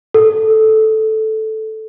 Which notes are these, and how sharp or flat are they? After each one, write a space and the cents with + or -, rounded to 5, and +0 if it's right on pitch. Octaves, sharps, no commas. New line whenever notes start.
A4 -5